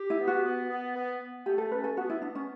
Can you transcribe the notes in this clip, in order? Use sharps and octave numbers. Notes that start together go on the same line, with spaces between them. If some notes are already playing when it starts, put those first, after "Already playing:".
Already playing: G4
E4
B3
F#4
B3
B3
B3
B3
A3 G4
A4
C#4 B4
A4
B3 F#4
E4
B3 D4
C#4